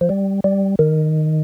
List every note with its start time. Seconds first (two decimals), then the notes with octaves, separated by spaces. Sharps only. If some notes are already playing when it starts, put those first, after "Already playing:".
0.01 F3
0.09 G3
0.44 G3
0.79 D#3